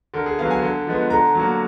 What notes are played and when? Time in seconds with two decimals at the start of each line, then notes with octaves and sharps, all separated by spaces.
0.14 D3 A#4
0.26 G#4
0.39 F#3 B3 F5
0.51 G#5
0.62 D3
0.87 F3 G#3 B3
1.10 D3 A#5
1.35 F#3 A#3